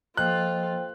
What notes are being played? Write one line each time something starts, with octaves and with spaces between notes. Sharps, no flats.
F3 A#3 F4 A4 C5 D#5 G5 F#6